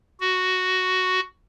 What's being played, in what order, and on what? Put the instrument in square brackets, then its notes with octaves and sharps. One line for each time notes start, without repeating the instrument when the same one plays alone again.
[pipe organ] F#4